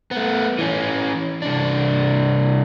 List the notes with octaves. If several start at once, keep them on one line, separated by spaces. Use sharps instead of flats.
A3 B3
E3 C#4
C2 D4